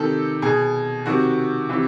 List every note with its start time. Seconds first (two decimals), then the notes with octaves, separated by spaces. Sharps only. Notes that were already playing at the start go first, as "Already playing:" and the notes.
Already playing: C3 D#3 A4
0.42 B2 G#4
1.06 C3 D#3 F#4
1.69 C3 E3